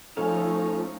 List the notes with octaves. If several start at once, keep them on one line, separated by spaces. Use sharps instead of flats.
F3 A3 C#4 D#4 A4 F5 G#5